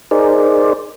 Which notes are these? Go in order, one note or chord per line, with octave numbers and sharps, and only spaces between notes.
D#4 G#4 A#4 C5 D5